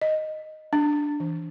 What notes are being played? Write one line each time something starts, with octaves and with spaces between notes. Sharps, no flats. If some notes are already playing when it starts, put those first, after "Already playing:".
D#5
D4
E3